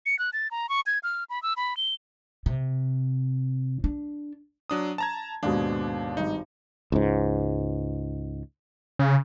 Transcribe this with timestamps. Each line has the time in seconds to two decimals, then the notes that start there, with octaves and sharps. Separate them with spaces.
0.06 C#7
0.19 F#6
0.33 A6
0.51 A#5
0.69 C#6
0.86 G#6
1.03 F6
1.30 B5
1.43 E6
1.57 B5
1.77 G7
2.46 C3
3.84 D4
4.70 F#3 D4 D#6
4.98 A5 A#5 G#6
5.43 D#2 G#2 B2 D4
6.17 G#1 G2 D#4
6.92 C#2 G#2
8.99 C#3